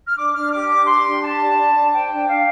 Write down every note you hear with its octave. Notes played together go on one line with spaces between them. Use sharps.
F6
D4 D6
D4 F6
G4 D6
D4
G4 C6
D4
G4 A5
D4
D4
D4
C5 G5
D4
D4 F5